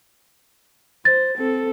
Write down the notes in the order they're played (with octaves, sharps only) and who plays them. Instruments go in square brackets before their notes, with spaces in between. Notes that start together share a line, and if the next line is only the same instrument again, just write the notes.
[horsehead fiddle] C5 [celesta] A6
[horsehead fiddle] C4 A4